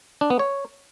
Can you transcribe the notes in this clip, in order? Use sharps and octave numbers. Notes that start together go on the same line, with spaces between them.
D4
B3
C#5